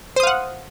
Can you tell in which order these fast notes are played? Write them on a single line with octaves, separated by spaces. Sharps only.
C5 D#6 F5 F#5